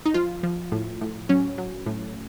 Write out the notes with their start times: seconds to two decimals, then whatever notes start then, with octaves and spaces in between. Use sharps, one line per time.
0.06 D#4
0.14 F3 F4
0.43 F3
0.72 A2
1.01 A2
1.29 F#3 C#4
1.58 F#3
1.86 A2